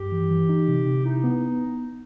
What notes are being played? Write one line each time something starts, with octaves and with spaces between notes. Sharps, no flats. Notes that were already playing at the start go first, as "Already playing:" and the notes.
Already playing: G2 G4
E3
E3
D#4
C3
C3
D#4 E4
B3